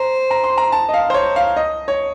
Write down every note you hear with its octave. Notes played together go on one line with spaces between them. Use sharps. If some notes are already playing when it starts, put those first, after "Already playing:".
Already playing: C5 A#5
A#5
C6
A#5
A5
D#5
F5
C5
C#5
F5
D#5
C#5